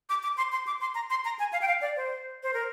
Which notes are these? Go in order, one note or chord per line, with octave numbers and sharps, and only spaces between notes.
D6
D6
C6
C6
D6
C6
A#5
C6
A#5
G#5
F5
G5
F5
D5
C5
C5
A#4